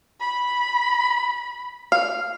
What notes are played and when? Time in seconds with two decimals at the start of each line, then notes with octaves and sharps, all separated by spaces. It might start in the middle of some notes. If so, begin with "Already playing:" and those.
0.20 B5
1.92 F5